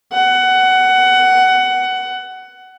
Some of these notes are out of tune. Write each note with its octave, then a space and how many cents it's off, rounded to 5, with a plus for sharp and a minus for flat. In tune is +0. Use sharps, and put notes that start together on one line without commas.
F#5 +15